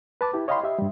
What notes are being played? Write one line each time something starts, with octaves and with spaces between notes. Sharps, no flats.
B4 A5 D6
E4 G4
C#5 D#5 F5 G5 B5 C6
G4 E5
G2 G3